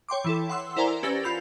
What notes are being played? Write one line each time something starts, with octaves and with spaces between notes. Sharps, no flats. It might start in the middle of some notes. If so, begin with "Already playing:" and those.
C#5 G5 C6 D6
E3 E4 A4
F#5 C6 E6
E4 A#4 C5 D5 G#5 A#5
C#4 G4 B4 E6 A6 A#6
F4 B5 G6 F7